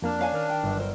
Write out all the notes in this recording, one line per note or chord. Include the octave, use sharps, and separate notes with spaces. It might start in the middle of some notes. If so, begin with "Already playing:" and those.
F2 A#3 D4 F6
C#4 F5 G#5
D#3 A#4 F6
G5
G1
A#4 C5